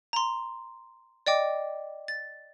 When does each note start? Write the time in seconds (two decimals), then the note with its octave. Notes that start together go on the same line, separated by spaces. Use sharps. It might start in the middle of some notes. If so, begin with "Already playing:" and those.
0.13 A#5 C6
1.27 D5 D#5 G5 D6
2.08 A6